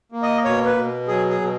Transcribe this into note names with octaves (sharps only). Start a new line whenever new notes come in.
A#3
D#5
B2 C#5
B4
B2
F#3 G#4
G#4
B2